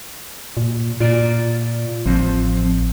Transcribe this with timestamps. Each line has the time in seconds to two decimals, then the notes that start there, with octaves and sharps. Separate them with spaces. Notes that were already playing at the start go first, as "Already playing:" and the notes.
0.57 A#2
1.00 A#2 F4 D5
2.06 A1 F3 C4